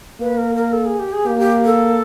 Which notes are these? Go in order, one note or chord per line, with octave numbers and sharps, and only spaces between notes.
A#3 B4
A#4
A#4
A4
G#4
G4
G#4
A#3 G4
G4
A4